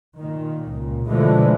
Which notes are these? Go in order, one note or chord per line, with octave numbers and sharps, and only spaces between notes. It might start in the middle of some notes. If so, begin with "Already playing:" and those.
A#2 D#3
C#2 A#2
B2 D3 E3 F3 G#3 A3